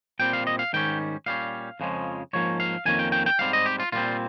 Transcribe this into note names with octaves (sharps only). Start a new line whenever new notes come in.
A#2 G3 C4 G5
F5
D#5
F5
G#2 D#3 G3 C#4 G5
A#2 G3 C#4 F5
F2 C#3 F3 G#3 C#4
G#2 F3 A#3 C#4 C#5
F5
F2 D#3 A#3 C#4 G#5
G5
G5
G5
G#2 G3 C4 F5
D#5
G4
F4
A#2 G3 C4 F4